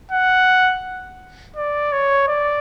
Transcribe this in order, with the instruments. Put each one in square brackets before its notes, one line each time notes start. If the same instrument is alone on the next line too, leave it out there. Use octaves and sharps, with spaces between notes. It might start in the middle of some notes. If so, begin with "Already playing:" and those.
[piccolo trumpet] F#5
D5
C#5
D5